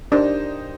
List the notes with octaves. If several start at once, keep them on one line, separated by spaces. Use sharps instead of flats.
A#3 D4 D#4 G4 C5